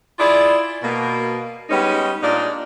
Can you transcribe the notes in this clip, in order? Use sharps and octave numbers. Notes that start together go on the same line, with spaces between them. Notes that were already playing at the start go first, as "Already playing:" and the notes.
E4 F4 G#4 D5
B2 A#3
G3 G#3 B3 C#4 D#4
A#2 G#3 D4 D#4 D5 F5